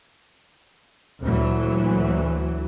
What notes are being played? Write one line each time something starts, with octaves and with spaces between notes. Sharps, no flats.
D2 A#2 E3 F#3